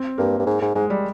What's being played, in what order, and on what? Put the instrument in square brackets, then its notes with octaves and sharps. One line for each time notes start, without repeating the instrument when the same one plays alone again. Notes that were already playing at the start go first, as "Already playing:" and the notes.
Already playing: [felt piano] C4
[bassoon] G2 [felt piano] A#3
[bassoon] G2
G#2
G#2
[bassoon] G#2 [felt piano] G#3
[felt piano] G3